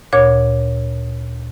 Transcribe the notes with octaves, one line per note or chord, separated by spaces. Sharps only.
D2 A#2 C#5 D6 G#6